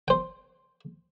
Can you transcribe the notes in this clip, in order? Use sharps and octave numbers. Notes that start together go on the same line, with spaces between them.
C5 G5